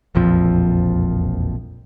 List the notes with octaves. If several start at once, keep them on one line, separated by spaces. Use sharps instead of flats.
E1 A#1 F2 F3